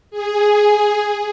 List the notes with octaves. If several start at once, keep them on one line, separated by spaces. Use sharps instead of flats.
G#4